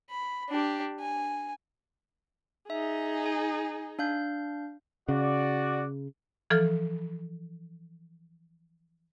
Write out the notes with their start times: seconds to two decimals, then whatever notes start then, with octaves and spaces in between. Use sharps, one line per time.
0.10 B5
0.50 D4 G4
1.00 G#5
2.70 D#4 G#4 E5
3.26 G#5
3.99 D4 F5 G6
5.09 C#3 F#4 D5
6.50 E3 F3 A4 F6